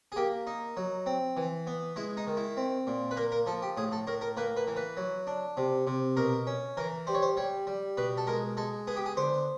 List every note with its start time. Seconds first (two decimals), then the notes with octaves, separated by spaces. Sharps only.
0.12 G#4
0.16 A#3 G4
0.47 D#4
0.77 F#3
1.06 C4
1.37 E3
1.67 B3
1.96 G#3 E4
2.17 D#4
2.27 D#3
2.37 E4
2.57 C4
2.87 A#2
3.11 B4
3.17 A#3 A#4
3.32 A#4
3.46 F3 A4
3.62 G4
3.77 A2 G#4
3.92 A4
4.07 A2 A#4
4.21 A#4
4.37 A#3 B4
4.57 B4
4.67 E3
4.77 B4
4.97 F#3
5.27 D4
5.57 C3
5.87 C3
6.17 B2 A#4
6.47 C#4
6.77 E3 A#4
7.07 G3 C5
7.15 C#5
7.22 C5
7.37 G3 C#5
7.67 G3
7.97 B2 B4
8.17 A4
8.27 G#3 A#4
8.57 G#3 A4
8.87 B3 G#4
8.96 G4
9.06 G#4
9.17 D3 C5